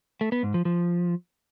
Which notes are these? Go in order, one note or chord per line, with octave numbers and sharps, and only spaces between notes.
A3
B3
G#2
F3
F3